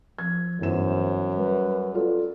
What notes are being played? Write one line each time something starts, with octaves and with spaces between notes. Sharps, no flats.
F3 G#6
G1 F#2 E3 C5 E7
G3 B4
F4 A4 D5